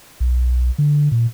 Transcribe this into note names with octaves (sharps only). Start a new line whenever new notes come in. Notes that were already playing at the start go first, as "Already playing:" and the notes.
B1
D3
A#2